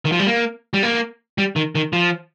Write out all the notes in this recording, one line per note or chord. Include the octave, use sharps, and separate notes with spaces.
D#3
F3
G3
A#3
G3
A#3
G3
D#3
D#3
F3